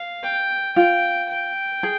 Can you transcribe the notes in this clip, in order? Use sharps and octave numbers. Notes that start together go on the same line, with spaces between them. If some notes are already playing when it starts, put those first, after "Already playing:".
Already playing: F5
G5
F4 G5
G5
G#4